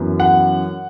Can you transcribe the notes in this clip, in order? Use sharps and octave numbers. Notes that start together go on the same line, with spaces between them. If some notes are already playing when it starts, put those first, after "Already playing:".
Already playing: F#2 E3 B3
F#5